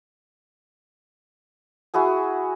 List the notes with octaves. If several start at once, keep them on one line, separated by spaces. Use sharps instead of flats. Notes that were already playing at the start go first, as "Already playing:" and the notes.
E4 F#4 G#4 G#5